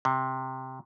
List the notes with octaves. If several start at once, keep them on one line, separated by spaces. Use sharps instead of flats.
C3